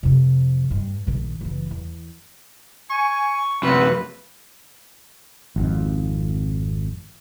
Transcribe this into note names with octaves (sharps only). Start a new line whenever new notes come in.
F2 C3
G2 G#3
A#1 D#3
F#1 E3
E2
G#5 C#6
F#2 C3 B3 C4 B4
G#1 F2